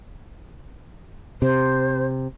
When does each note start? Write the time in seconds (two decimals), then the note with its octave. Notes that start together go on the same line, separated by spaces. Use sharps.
1.42 C3 C5